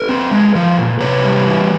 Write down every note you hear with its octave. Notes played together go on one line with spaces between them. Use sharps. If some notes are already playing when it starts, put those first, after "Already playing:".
Already playing: A4 B4
C4
G#3
F3
A#2
C3 B4 C#5
G3
E3